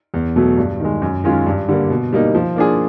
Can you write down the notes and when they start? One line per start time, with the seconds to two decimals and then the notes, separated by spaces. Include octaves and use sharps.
0.14 E2
0.36 B2 F#3 A3
0.57 G2
0.80 D#3 G#3
1.02 F#2
1.24 D#3 G#3 C#4 F4
1.46 G2
1.68 D3 G3 A#3
1.90 B2
2.13 G3 A#3 D#4
2.35 F3
2.56 A#3 D4 F4 G#4